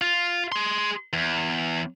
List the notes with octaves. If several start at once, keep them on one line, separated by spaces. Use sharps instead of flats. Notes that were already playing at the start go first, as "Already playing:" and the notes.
F4
G#4 C6
E2